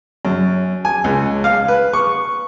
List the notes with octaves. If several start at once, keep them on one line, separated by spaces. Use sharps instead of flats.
F#2
G#5
C#2
F5
B4
C#6